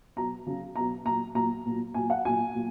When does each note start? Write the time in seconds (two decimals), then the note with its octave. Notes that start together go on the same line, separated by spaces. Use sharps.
0.16 B2 F#3 A#5
0.46 C#3 F#3
0.76 B2 F#3 A#5
1.05 A#2 F#3 A#5
1.35 A#2 F#3 A#5
1.66 A#2 F#3
1.94 A#2 F#3 G#5
2.10 F#5
2.25 A#2 F#3 G#5
2.55 A#2 F#3